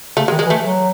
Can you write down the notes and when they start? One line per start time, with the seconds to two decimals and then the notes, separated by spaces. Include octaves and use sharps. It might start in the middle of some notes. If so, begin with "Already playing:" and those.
0.17 C#3 A3
0.28 G#3
0.32 D#3
0.39 G#3
0.46 E3
0.50 A3
0.62 F#3